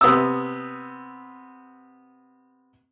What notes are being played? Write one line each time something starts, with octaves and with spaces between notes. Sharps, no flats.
C3 B3 D#6 E6